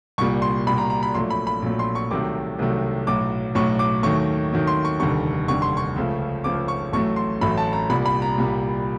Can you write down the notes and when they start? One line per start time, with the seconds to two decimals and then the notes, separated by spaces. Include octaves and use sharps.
0.18 C2 C#6
0.21 A#2 G3
0.42 C6
0.67 C2 A#2 G3 B5
0.78 A#5
0.90 A#5
1.03 B5
1.15 A#1 A#2 F#3 A3 C6
1.30 B5
1.47 B5
1.62 A#1 A#2 F#3 A3
1.79 C6
1.95 C#6
2.11 C2 C3 D#3 F#3 A3 D6
2.59 C2 C3 D#3 F#3 A3
3.07 B1 A2 F#3 D6
3.55 B1 A2 F#3 C#6
3.79 D6
4.03 D#2 D#3 F#3 A3 C#6
4.53 D#2 D#3 F#3 A3
4.67 C6
4.85 C#6
5.00 F1 D#2 D3 G3 C#6
5.48 F1 D#2 D3 G3 C#6
5.62 C6
5.77 C#6
5.96 C#2 C#3 F3 A3
6.44 C#2 C#3 F3 A3 D6
6.68 C#6
6.93 A1 A2 F#3 A3 C#6
7.16 C6
7.41 A1 A2 F#3 A3 B5
7.58 A5
7.73 A#5
7.89 C2 A#2 G3 B5
8.06 B5
8.22 A#5
8.38 C2 A#2 G3